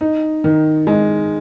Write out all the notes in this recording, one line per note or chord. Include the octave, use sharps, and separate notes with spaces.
D#4
D#3
G#3